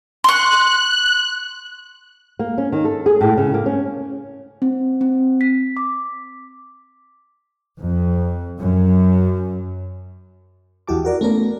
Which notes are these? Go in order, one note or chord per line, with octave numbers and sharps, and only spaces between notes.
C6 C#6 F#6
A#3
C#4
D#3
A4
G#4
A2
C#3
A#3
C#4
C4
C4
B6
D6
F2
F#2
E2 E4 F#4 G4 A5 D6
F#4 A#4 D5
A3 B3 C#4 A4 A#4